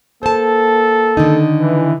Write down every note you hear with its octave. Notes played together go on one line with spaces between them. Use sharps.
A#3 A4 C5 A5
D3 D#3 D#4
E3